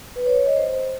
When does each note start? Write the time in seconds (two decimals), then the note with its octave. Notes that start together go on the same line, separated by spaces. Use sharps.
0.16 B4
0.26 C#5
0.36 C#5
0.46 D#5
0.56 C5